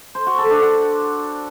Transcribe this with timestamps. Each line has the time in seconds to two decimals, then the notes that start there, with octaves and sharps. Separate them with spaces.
0.15 C5
0.27 F#4
0.38 A4
0.50 D4
0.62 F#5